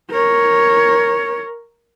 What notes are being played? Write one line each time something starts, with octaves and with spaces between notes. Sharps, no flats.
A#4 C#5